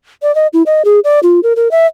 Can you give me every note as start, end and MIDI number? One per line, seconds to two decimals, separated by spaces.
0.22 0.34 74
0.35 0.47 75
0.53 0.63 64
0.66 0.82 75
0.85 1.00 68
1.04 1.20 74
1.23 1.40 65
1.43 1.53 70
1.56 1.71 70
1.71 1.86 76